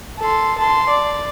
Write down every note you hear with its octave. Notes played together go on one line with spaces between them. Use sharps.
A4 C6
A5 C6
D5